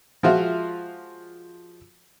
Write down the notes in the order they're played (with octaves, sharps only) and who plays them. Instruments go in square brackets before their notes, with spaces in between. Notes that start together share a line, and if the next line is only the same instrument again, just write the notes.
[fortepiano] F3 G#3 F4 F#4 E5